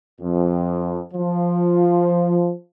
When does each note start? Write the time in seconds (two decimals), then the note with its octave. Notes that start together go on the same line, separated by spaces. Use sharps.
0.21 F2
1.14 F3